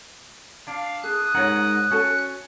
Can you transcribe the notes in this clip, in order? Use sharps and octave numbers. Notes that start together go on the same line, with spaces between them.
D4 F5
G#4 D#6 F#6
G#2 D#4 A#4 C#5 F#5
C#4 F#4 A4